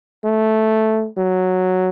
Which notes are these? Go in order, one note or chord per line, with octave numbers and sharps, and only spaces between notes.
A3
F#3